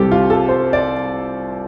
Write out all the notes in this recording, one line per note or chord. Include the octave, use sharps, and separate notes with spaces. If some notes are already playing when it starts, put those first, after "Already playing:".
Already playing: C2 C3 G3 G4 A4
F4
A4
C5
D5